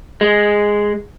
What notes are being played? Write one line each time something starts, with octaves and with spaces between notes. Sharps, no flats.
G#3